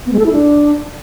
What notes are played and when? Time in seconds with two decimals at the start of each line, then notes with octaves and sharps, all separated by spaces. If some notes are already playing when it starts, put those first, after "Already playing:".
0.06 B3
0.13 G#3
0.19 A4
0.26 E4
0.32 D4